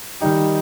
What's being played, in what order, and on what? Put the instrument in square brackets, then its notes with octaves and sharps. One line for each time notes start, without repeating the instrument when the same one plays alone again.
[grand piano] D#3 G3 D#4 G4